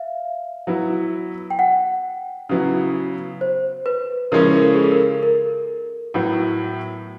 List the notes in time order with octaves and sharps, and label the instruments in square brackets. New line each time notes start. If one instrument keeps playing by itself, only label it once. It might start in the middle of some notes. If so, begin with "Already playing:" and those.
Already playing: [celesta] E5 F5
[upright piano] F#3 B3 E4
[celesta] G5
F#5
[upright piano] C#3 F#3 B3 E4
[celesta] C5
B4
[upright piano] C#3 F3 G#3 C#4 E4 [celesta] A#4
[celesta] A#4
A4
G#4
A4
A#4
A#4
[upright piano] A2 F#3 B3 E4